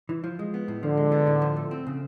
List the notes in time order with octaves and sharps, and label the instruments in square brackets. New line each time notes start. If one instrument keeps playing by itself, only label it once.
[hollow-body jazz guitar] E3
F3
G#3
B3
A2
[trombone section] D3 [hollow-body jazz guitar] F3
[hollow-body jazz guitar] G#3
B3
A2
F3
A3
C4
C#3